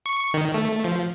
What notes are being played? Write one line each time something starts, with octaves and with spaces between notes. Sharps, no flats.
C#6
D#3
A3
F3